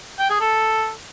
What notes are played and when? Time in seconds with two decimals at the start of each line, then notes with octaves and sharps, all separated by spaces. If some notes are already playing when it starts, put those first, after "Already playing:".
0.19 G5
0.30 G#4
0.40 A4